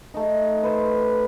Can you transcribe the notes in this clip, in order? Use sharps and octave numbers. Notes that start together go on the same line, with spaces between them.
A3 D#4
B4 C5